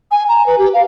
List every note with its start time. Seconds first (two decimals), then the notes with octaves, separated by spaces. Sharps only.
0.11 G#5
0.28 A#5
0.46 B4
0.58 G4
0.73 F5